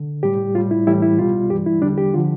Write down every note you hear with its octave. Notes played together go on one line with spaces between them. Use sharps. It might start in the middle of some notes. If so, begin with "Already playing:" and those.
Already playing: D3
A2 G3 G4
A2 G3 F4
E4
A2 E3 G3 E4
E4
C2 B2 G3 F4
G2 E3 G3 G4
E4
E2 D3 G3 D4
G4
D3 F3 F4